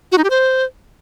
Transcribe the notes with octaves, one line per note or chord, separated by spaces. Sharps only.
F#4
D#4
G4
C5